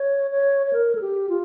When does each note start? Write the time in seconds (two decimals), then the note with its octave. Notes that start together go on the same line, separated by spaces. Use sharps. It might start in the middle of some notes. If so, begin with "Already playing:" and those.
Already playing: C#5
0.31 C#5
0.67 C#5
0.73 A#4
0.95 A4
1.01 G4
1.29 F4